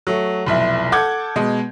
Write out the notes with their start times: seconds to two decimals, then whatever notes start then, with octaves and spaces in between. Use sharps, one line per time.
0.07 F#3 A3
0.47 F1 B1 E4
0.92 A4 F#5 D6 G6 G#6
1.36 B2 G#3